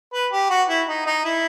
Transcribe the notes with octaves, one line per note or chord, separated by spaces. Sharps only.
B4
G4
F#4
E4
D#4
D#4
E4